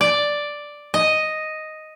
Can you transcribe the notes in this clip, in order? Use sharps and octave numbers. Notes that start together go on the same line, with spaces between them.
D5
D#5